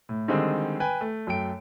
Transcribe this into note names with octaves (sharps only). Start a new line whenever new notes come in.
A2
D3 D#3 G3 G#3 C4
B4 G5 G#5
A3
F#2 A3 G5 D7